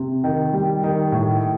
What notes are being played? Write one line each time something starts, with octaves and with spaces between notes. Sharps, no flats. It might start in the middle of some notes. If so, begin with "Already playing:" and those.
Already playing: C3
D#3
G3
D#3
A2